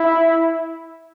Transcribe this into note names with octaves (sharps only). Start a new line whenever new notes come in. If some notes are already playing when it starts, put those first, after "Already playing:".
Already playing: E4